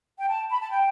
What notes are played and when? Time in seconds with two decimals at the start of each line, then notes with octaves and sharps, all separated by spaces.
0.18 G5
0.28 A5
0.51 B5
0.60 A5
0.69 G5